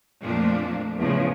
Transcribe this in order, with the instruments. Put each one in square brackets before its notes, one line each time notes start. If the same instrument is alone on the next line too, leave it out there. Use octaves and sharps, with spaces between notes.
[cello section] F2 A#2 F3 A3 A#3 D4
E2 A2 C#3 F3